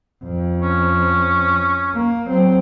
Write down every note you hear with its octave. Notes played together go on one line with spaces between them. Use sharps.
F2
C#4
A#3
F#3 C4